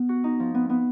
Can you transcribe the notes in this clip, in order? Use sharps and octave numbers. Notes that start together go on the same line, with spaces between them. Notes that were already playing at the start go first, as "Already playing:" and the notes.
Already playing: B3
F#4
D#4
F3
B3
B3